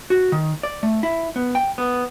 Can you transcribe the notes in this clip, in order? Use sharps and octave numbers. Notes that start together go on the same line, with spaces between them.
F#4
D#3
D5
A3
E4
B3
G5
B3